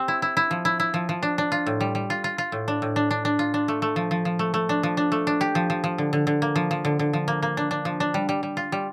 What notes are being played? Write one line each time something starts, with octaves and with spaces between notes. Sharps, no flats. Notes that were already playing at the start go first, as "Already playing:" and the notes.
Already playing: C4 G4
E4
E4
E4
F3
E4
E4
F3
F3
D4
D4
F4
A2
G3
G3
F4
F4
F4
A2
D4
A2
D4
D4
D4
F4
D4
A3
A3
F3
F3
F3
A3
A3
D4
F3
D4
A3
D4
G4
F3
F3
F3
D3
D3
D3
A#3
F3
F3
D3
D3
F3
A#3
A#3
D4
D4
F3
D4
G3
G3
G3
F4
G3